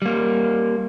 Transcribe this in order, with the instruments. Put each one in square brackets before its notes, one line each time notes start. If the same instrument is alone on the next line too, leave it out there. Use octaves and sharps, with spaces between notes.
[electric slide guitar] G3 A#3